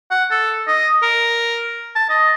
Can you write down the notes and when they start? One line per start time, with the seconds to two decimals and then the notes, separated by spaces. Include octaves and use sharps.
0.11 F#5
0.31 A4
0.68 D#5
1.03 A#4
1.96 A5
2.10 D#5